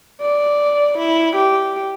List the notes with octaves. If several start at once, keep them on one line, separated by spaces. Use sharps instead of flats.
D5
E4
G4